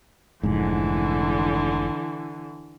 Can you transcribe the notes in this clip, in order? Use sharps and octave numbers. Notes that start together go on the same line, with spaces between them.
F1 G#2 D3 E3